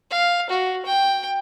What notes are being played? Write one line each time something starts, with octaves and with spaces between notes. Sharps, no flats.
F5
F#4
G5